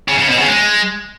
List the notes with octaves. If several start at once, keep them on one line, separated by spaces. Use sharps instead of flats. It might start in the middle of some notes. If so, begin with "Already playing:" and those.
C#3
C#3
B2
C#3
G#3